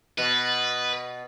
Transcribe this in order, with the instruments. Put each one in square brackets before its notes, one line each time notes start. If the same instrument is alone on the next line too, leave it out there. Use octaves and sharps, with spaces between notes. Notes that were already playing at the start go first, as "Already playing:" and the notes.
[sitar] B2 [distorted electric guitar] B4